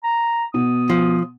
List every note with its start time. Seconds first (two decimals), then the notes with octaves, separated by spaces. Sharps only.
0.04 A#5
0.54 B2 D#6
0.90 F3